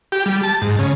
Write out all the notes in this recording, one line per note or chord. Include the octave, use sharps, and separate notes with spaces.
G4
G3
A5
G#2
C#3